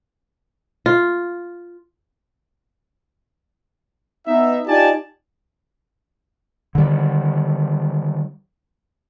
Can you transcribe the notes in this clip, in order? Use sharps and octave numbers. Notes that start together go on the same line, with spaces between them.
F4
B3 D#4 E5
D#4 F4 G4 D5 G#5 A5
D3 D#3 G3